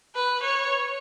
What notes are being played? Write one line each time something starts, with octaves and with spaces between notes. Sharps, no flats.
B4
C#5